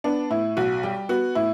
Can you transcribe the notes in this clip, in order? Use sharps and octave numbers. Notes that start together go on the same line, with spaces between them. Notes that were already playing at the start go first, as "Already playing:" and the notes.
B3 D4
A2 E4
B1 F#4
G3 G4
B3 F#4
A2 E4